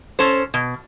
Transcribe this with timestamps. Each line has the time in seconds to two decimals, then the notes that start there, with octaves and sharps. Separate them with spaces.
0.19 C#4 A4 C5
0.54 B2